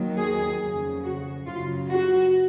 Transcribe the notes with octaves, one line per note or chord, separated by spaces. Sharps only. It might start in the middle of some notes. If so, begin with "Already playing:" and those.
Already playing: D#2 D#3 F#3
G#4
F2 C#3 F#3
F#4
F#2 C#3 F#3 F4
F#4